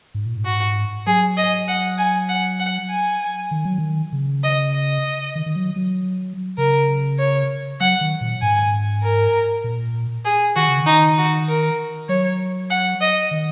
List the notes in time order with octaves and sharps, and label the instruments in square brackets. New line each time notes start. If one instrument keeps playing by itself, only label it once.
[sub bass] G#2
A#2
G#2
[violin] F#4
[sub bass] F#3 [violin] G#4
[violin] D#5
F#5
G#5
F#5
F#5
G#5
[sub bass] D#3
F#3
D#3
C#3
[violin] D#5
D#5
[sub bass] D#3
D#3
F#3
F#3
[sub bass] C#3 [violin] A#4
[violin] C#5
[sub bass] F#3 [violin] F#5
[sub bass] D#3
A#2
[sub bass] G#2 [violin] G#5
[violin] A#4
[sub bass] A#2
[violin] G#4
[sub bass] D#3 [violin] F#4
[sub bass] C#3
D#3
[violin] D#4
F#4
A#4
[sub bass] F#3 [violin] C#5
[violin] F#5
D#5
[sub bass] D#3